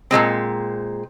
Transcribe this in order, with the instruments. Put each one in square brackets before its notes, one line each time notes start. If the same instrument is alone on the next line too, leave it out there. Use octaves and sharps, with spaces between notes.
[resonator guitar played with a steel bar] A#2 F#3 G#3 C4